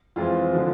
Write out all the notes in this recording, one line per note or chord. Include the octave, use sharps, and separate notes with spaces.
F2 E3 G#3 C4 F4
D3 F3